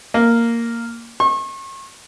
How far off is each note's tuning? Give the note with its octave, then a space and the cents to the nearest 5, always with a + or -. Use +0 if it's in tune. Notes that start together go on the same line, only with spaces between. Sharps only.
A#3 -5
C#6 -40